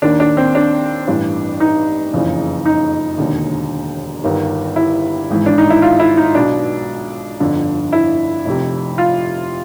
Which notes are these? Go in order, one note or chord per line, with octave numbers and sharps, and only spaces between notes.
D#2 D#3 D4
D4
C4
D4
A1 G2 E3
D#4
F#1 F2 C#3 E3
D#4
E1 D#2 D3
G1 G2 D#3
E4
G#1 G#2 E3
D4
D#4
E4
F4
E4
D#4
B1 B2 D4
G1 F2 D3
E4
F1 F2 C3
F4